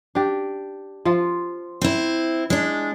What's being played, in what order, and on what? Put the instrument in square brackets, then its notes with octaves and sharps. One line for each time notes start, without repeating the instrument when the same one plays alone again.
[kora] D4 G4
F3 F4
[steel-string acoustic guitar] C4 E4
G#3 D4